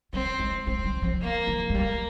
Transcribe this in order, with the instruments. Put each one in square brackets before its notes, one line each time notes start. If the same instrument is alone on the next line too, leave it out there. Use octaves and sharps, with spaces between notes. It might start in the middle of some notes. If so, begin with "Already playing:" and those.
[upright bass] G3 [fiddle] C4
[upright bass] G#3
[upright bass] G#3 [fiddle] C4
[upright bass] G3
F3
[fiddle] A#3
[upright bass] F3
G#3
[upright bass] G3 [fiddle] A#3